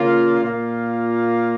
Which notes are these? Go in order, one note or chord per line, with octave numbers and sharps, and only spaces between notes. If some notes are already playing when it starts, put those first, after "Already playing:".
Already playing: C#3 A#3 F4
A#2 A#3 F4